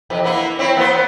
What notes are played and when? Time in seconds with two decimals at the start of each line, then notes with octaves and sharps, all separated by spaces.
0.10 F2 C3 E3
0.24 A#3 B3 E4
0.59 C4 E4 C#5
0.77 A#3 B3 C5